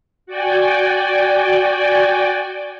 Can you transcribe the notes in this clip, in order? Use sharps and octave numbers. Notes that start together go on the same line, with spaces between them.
F#4 D5 G5 G#5